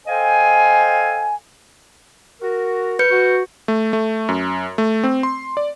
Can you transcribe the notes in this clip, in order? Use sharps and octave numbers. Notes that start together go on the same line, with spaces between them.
A4 C5 D#5 F5 G5 G#5
F#4 A#4
B4 G6 C#7
F#4
A3
A3
F#2
A3
C4
C6
D5